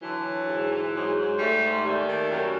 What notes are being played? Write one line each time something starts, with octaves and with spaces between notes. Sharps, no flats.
D3 E3 F#3
D3
G#2
E3
G#2 F#3 G#3
G#2
G#2 G3 A3
G#2
D#2 G3 A3
D#3
F#2